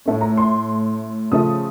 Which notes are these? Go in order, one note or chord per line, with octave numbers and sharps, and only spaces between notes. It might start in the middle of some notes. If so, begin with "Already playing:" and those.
A2 A3 C#4
A#5
C6
C#3 F3 A3 D#6